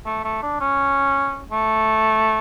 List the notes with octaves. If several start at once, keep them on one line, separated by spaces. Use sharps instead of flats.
A3
A3
D4
C#4
A3